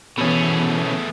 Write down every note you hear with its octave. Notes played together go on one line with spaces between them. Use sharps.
B2 E3 A3 B3 C#4 G#4